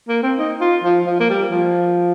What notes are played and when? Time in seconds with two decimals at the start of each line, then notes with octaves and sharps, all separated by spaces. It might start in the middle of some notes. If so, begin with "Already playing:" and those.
0.09 A#3
0.23 C4
0.38 D#4
0.61 F4
0.84 F3
1.06 F3
1.20 A#3
1.30 G3
1.52 F3